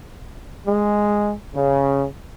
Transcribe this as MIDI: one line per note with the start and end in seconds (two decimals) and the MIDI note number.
0.67 1.34 56
1.55 2.06 49